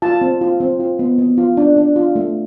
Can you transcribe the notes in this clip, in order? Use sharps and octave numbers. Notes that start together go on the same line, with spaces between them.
F4 A5
C4
F4
C4
F4
B3
B3
F4
D4
D4
F4
A3